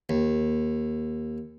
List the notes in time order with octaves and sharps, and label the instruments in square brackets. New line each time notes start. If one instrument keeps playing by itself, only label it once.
[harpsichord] D#2